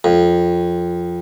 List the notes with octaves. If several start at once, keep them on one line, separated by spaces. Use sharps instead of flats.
F2